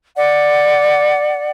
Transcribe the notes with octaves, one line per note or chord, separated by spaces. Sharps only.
D5 F#5